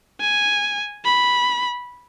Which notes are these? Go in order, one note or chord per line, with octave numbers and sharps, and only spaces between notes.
G#5
B5